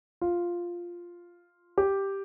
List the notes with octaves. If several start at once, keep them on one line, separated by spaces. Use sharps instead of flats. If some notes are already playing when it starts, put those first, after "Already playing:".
F4
G4